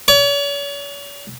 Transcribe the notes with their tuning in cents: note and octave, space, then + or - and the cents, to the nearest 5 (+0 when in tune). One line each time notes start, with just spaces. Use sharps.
C#5 +40